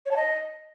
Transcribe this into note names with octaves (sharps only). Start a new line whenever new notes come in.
C#5
A5
D#5